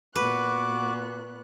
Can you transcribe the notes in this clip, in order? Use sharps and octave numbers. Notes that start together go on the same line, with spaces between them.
A#2 B3 F#4 B4 D6 F#6